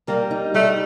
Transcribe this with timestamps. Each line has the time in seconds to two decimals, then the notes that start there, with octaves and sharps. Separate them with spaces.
0.08 G3 A#3
0.31 D#4
0.54 G3 A3